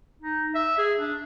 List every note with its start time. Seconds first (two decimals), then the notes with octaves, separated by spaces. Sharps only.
0.22 D#4
0.55 E5
0.78 G#4
0.99 D4